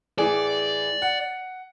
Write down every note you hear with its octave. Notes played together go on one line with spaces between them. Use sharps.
A2 E3 G#4 D5
F#5